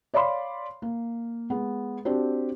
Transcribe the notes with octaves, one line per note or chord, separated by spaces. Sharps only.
C#5 D5 F5 B5 C6
A#3
G#3 B3
C4 D4 F#4 G4